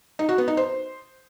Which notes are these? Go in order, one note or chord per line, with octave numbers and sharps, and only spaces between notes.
D#4
F#4
B3
D#4
C5